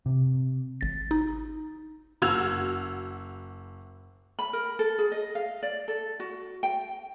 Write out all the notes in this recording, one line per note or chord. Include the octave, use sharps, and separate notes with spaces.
C3
G#1 A6
D#4
F#1 F#4 E6 F6 G#6 F7
B5
A#4
A4
G#4
D#5
F5
D5
A4
F#4
G5